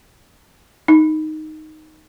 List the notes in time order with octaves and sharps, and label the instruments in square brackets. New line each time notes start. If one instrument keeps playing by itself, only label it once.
[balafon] D#4